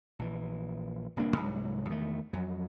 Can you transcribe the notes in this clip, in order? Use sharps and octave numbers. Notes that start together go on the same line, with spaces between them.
A#1 E3
D1 C2 A#3 D4
C2 G#2 F#3
E2 D#3 A3
F2 F#3